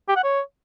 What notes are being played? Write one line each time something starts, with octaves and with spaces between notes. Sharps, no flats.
G4
F#5
C#5